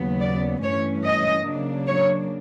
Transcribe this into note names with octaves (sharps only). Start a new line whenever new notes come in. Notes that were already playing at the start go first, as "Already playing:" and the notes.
Already playing: D#2 C#3 F#3 B3
D5
G2 E3 A3 C#4 C#5
D#5
C#3 F#3 A#3 D4
C#5